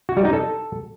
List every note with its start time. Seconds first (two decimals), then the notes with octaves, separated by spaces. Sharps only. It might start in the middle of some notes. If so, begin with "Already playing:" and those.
0.09 F#4
0.17 G3
0.25 D#4
0.33 A4